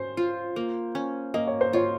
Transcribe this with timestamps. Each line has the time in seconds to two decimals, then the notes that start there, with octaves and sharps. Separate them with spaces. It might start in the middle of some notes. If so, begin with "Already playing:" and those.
Already playing: C#4 C5
0.17 F4
0.56 A#3
0.95 C#4
1.34 A#3 D#5
1.47 C#5
1.61 C5
1.73 F4 C#5